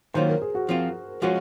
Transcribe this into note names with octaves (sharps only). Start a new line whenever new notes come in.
D#3 F#3 A#3 F4 C5
A#4
G#4
F#4
F3 C4 F4
F3 G#3 C#4 F4 F#4